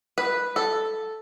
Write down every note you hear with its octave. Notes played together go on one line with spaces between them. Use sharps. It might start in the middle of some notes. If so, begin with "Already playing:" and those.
B4
A4